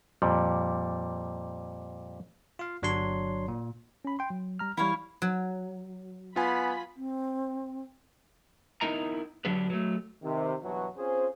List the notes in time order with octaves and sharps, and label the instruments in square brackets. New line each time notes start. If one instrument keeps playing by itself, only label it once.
[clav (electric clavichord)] F2 A#2 G3
[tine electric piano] F4 F5
G1 F#3 D4 C#5 C6
A#2
C#4 B5
G5 C6
F#3
G3 A#5 F6
[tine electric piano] E3 G3 [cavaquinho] E4 C#5 F5
[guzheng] F#3
[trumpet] B3 [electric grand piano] F4 G#5 [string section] B5
[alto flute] C4
[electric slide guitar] B3 D#4 E4 A#4 D#5 A#5
D3 F#3 D4 G4 B4
F#3 A3
[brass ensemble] C3 D#3
G2 B2 E3 F#3 F#4
C4 C#4 F4 G#4 C5